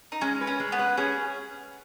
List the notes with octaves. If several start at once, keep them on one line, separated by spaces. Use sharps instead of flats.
D#4
G#3 C#4
B4
C#4
G#3
B3
B4
C#4 G#4